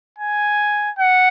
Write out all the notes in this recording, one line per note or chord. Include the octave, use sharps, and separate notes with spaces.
G#5
F#5